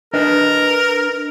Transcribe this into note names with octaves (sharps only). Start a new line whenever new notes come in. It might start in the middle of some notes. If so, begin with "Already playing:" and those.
D4 A#4 B4 D#5